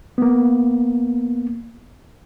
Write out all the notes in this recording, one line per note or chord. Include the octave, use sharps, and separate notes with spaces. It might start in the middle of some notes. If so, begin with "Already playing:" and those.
A#3 B3